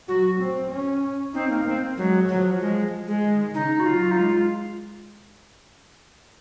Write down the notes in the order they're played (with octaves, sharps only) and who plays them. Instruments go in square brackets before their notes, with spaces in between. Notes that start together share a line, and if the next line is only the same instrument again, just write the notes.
[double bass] F#3 [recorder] F#4
[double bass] C4
C#4
[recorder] C4 [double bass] D#4
[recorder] A#3
[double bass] A#3 [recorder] C4
[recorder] F#3 [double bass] G#3
[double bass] F3 [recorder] F#3
[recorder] G#3
G#3
[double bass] D#3
[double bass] C#3 [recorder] D#4
[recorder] F#4
[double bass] F#3 [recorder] F4
[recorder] D#4
[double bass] G#3 [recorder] F4